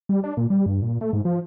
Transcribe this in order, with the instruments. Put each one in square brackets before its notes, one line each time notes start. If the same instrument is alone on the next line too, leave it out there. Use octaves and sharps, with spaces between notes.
[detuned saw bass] G3
D4
A#2
G3
G2
A#2
A3
G#2
F3